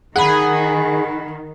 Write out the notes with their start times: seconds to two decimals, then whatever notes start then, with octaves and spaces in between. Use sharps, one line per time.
0.16 D#3 G#4 F#5 B5